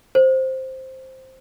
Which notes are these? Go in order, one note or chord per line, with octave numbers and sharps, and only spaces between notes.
C5